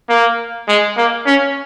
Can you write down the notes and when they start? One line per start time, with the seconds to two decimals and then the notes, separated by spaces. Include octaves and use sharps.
0.09 A#3
0.68 G#3
0.97 A#3
1.26 C#4